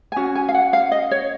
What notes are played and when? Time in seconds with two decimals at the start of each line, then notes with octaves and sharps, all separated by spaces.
0.12 G#5
0.16 C#4 F#4
0.35 G#5
0.49 F5
0.54 F#5
0.73 F5
0.92 D#5
1.11 C#5